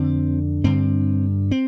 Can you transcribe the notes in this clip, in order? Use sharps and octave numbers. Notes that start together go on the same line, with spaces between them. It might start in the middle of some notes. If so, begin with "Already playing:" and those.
Already playing: F2 D3 C4
G2 D3 C4
C4